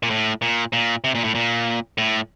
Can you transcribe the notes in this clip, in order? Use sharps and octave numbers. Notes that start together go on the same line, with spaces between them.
A#2
A2
A#2
A#2
C3
A#2
A2
A#2
A2